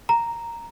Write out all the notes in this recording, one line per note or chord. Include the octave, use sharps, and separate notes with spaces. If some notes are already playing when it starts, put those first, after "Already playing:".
A#5